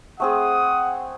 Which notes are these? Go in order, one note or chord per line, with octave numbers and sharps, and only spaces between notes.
A3 C4 G#4 F#5 D#6